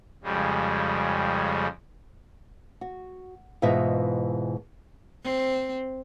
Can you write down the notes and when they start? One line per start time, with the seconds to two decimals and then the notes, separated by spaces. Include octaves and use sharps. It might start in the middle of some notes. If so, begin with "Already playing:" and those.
0.23 F2 C#3 G3 G#3
2.81 F#4
3.62 G#2 B2 E3 F4 E5
5.23 C4